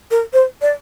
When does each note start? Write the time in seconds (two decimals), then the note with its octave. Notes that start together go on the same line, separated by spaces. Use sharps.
0.11 A#4
0.33 C5
0.62 D5